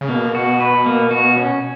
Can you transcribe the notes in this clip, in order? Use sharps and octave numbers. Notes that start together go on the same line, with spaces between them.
C#3
B2 A#3
F#4
B4
A#3
F#4
C#4